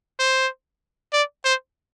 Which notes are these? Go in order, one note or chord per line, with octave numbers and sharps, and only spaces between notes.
C5
D5
C5